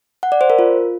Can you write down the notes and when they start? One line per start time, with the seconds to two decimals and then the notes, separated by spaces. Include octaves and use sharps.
0.23 F#5
0.32 D5
0.41 C5
0.50 A#4
0.59 F4